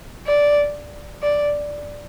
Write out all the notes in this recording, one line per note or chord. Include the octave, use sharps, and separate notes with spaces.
D5
D5